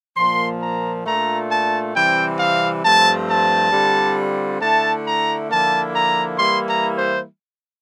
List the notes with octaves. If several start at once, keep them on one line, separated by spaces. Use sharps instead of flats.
A#2 F3 A#3 C6
A#5
A#2 A3 D4 F4 A#5
A5
C3 E3 G3 C4 G5
F5
G2 F3 A3 C4 A5
A5
D3 G3 C4 F4
D3 A3 E4 A5
A#5
D3 F3 A#3 E4 A5
A#5
E3 G3 A#3 E4 C6
A#5
C5